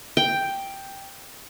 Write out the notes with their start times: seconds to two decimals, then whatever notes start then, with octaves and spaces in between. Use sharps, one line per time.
0.17 G5